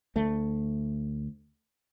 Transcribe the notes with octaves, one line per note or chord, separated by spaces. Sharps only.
D2 A3